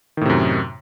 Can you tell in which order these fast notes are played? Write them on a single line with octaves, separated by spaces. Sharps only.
D#3 A2 C3 F#2